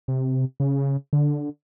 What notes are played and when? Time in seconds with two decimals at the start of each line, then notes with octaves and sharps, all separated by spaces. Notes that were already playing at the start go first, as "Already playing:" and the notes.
0.08 C3
0.60 C#3
1.13 D3